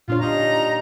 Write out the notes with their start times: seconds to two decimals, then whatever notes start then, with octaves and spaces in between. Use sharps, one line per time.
0.08 A#2 D4 F4 C#5
0.21 G3 D#4 D#5 A#5